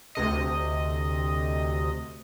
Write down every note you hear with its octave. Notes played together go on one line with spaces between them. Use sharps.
D2 C3 D#5